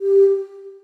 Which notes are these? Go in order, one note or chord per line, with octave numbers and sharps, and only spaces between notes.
G4